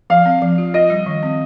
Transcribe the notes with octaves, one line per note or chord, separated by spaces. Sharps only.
F3 F5
C4
F3
F4
F4 D#5
G3
D#3
C4